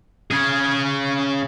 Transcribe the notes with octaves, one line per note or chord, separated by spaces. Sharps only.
C#3 G#4